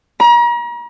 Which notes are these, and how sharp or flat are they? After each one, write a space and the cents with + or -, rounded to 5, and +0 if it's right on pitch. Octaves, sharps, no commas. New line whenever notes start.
A#5 +40